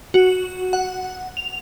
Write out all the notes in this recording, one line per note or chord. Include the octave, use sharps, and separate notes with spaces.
F#4
F#5
F7